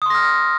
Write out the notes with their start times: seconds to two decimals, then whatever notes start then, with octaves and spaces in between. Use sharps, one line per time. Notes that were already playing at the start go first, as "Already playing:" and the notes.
0.02 D#6
0.06 C6
0.10 A#6
0.15 F6